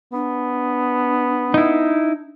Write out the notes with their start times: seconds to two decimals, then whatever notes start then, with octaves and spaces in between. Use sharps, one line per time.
0.13 B3 D4
1.54 D#4 E4